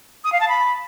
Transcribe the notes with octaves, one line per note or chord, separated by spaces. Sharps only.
D#6
F5
A5
B5